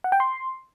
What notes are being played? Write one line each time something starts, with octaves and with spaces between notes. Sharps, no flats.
F#5
G5
C6